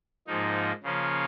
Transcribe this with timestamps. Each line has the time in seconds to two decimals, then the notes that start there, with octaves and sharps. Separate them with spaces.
0.27 G#2 F3 A#3 D#4
0.83 C#3 F3 A#3 C#4 F4